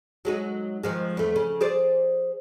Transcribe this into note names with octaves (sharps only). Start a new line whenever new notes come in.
F#3 G#3 D#4
D#3 F3 G#3
E2 A3
C#3
G#4 C5 D5